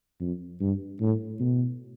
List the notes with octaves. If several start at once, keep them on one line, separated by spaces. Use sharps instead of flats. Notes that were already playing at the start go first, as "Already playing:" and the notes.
F2
G2
A2
B2